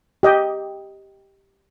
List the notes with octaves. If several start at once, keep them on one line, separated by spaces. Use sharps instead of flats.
G4 D#5 G5